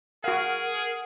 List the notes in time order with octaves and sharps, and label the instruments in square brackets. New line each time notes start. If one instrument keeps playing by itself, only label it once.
[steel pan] F#4 F5 [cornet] G#4 [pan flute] A#4 [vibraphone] F#5